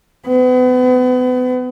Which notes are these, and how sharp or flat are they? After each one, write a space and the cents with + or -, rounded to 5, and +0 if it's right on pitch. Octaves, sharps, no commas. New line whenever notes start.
B3 +35